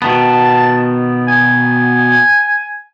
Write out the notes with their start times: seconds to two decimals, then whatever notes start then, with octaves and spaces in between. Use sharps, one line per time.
0.02 B2 D#3 B3 A5
1.28 G#5